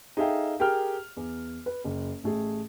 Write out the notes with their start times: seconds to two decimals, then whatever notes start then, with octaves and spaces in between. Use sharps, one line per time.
0.17 D#4 G#4 A4 E5 F5 G5
0.60 G4 G#4 A#4 G5 F6
1.17 E2
1.66 B4
1.84 F#1
2.23 A1 A3 G#4